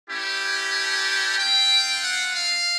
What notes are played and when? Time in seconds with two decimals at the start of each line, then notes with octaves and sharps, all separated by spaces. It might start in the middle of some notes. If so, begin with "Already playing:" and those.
0.09 A3 C#4 E4 G4
0.74 A5
1.38 C4 F4 G5
2.04 F#5
2.36 F5